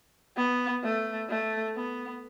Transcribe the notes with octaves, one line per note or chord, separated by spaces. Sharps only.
B3
A3
A3
B3